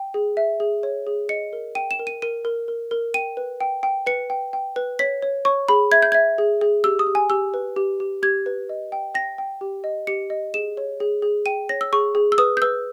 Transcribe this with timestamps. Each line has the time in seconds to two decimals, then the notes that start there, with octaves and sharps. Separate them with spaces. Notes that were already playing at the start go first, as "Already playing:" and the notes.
Already playing: G5
0.14 G#4
0.37 E5
0.60 G#4
0.83 C#5
1.07 G#4
1.29 D#5 C#7
1.53 A#4
1.75 G5 D#7
1.91 E7
1.99 A#4
2.07 D#7
2.22 A#4 D#7
2.45 A#4
2.68 A#4
2.91 A#4
3.14 G5 D#7
3.37 B4
3.61 G5
3.83 G5
4.06 B4 C#7
4.30 G5
4.53 G5
4.76 B4
4.99 C#5 B6
5.22 C#5
5.45 C#5 C#6
5.69 G#4 B5
5.92 E5 G#6
6.02 G6
6.12 E5 G#6
6.38 G#4
6.61 G#4
6.84 G4 E6
6.99 D#6
7.07 G4
7.15 G#5
7.30 G4 E6
7.54 B4
7.76 G4
8.00 G4
8.23 G4 G#6
8.46 B4
8.69 D#5
8.92 G5
9.15 G5 A#6
9.38 G5
9.61 G4
9.84 D#5
10.07 G4 C#7
10.30 D#5
10.54 G#4 E7
10.77 C#5
11.00 G#4
11.22 G#4
11.46 G5 D#7
11.69 C#5 A#6
11.81 E6
11.92 G#4 C#6
12.15 G#4
12.32 E6
12.38 B4 D#6
12.57 G6
12.62 B4 E6